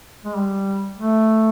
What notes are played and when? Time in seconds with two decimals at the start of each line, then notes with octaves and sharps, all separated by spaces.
0.25 G#3
0.35 G3
0.97 A3